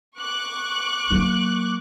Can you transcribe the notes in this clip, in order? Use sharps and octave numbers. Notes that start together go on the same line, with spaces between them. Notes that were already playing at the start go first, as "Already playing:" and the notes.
C#6 D6 F#6
F#3 A#3